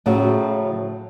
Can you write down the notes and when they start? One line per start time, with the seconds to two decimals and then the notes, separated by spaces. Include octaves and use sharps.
0.06 A2 C#3 F3 F#3 F#4